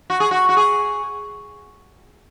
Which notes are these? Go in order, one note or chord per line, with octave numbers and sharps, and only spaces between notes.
F#4
G#4
F#4
F#4
G#4